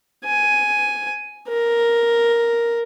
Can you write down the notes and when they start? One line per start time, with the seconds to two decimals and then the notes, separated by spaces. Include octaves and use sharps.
0.25 G#5
1.48 A#4